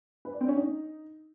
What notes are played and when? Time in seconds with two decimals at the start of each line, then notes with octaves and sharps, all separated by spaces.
0.25 B4
0.33 D5
0.41 C4
0.48 C#4
0.56 D#4